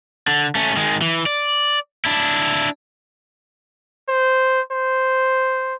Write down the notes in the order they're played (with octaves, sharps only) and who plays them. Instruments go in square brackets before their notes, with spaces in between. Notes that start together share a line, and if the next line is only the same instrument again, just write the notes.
[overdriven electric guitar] D3
A3 C#4
D#3 G#3
E3
D5
D4 E4
[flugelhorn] C5
C5